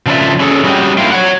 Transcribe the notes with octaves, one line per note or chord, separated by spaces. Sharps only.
C#3 F3 A4 B4 D5 E5
C#4 G#4 A4
G3 C#4 E4 F#4 G4 D#5
D3 A#3 C4 E4 F4
C#5 F#5